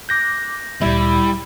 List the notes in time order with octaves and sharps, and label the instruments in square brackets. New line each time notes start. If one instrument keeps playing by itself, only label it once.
[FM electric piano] D6 F#6 [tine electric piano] G6 A#6
[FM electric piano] D2 A#2 [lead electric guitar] G3 [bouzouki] E4